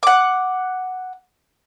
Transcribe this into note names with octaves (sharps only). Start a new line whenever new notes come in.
F#5 D6